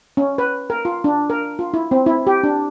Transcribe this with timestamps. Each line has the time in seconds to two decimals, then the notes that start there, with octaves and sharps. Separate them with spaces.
0.17 C#4
0.38 B4
0.70 A#4
0.85 F4
1.04 D4
1.30 A#4
1.59 F4
1.74 E4
1.91 C4
2.06 E4
2.27 G4
2.44 D4